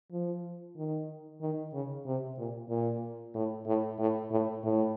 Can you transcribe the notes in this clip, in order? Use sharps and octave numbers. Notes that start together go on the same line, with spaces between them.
F3
D#3
D#3
C#3
C3
A#2
A#2
A2
A2
A2
A2
A2